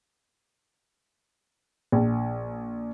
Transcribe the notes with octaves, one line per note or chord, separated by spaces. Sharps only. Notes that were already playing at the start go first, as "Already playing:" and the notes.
A#1